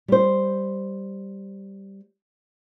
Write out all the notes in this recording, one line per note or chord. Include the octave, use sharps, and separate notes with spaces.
G3 C5